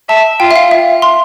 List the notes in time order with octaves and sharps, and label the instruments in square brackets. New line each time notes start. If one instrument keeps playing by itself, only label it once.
[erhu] E5 [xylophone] A5
[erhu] F4 [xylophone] G5
[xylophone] E5
F5
E5
C6